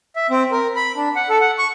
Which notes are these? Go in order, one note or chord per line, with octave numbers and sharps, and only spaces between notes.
E5
C4
A#4
B5
D4
F#5
A4
F#5
C#6